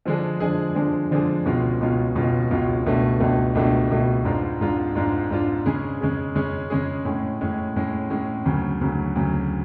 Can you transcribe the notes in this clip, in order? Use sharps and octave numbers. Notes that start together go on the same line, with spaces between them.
D3 F3 G#3 D4 G#4
D3 F3 G#3 D4 G#4
D3 F3 G#3 D4 G#4
D3 F3 G#3 D4 G#4
C#2 B2 G#3 C#4 F4
C#2 B2 G#3 C#4 F4
C#2 B2 G#3 C#4 F4
C#2 B2 G#3 C#4 F4
C#2 B2 A3 D4
C#2 B2 A3 D4
C#2 B2 A3 D4
C#2 B2 A3 D4
G#2 G#3 D4 F4
G#2 G#3 D4 F4
G#2 G#3 D4 F4
G#2 G#3 D4 F4
C#3 G#3 C#4 G#4
C#3 G#3 C#4 G#4
C#3 G#3 C#4 G#4
C#3 G#3 C#4 G#4
A2 G#3 C#4
A2 G#3 C#4
A2 G#3 C#4
A2 G#3 C#4
D2 C#3 F#3
D2 C#3 F#3
D2 C#3 F#3